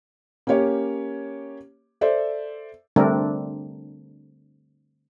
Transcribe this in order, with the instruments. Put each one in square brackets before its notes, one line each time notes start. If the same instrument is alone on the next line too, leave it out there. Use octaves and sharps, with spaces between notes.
[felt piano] A#3 C#4 G4 C#5
A4 C5 D5 E5
[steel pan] D3 G3 A3 C4 D4 A#4